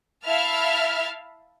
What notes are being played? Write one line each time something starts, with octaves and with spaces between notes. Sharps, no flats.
E4 E5 F5 A5 F6